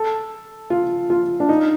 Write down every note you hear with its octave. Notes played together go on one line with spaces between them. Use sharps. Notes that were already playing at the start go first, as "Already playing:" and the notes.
Already playing: A4
F4
F4
D4
D#4